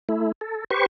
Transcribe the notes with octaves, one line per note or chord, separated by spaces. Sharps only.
A3 E4
A4
G4 B4 C5 C#6